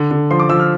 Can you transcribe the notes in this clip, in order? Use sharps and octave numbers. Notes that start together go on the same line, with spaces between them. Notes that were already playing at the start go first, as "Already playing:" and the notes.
Already playing: D3
D3
F3 C6
D6
F3 E6
F6